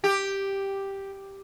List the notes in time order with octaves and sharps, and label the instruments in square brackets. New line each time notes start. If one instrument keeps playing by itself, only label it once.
[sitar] G4